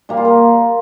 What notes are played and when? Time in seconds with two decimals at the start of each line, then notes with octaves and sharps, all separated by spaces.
0.09 A#2 G3 A#3
0.17 F4
0.25 A#4